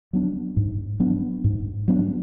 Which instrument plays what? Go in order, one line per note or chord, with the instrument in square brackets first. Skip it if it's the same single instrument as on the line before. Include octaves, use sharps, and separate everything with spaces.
[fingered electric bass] F#3 B3 D4
G#2
F#3 B3 D4
G#2
F#3 B3 D4